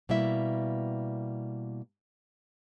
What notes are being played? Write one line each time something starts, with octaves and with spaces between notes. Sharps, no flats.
B2 G3 A#3 E4 E5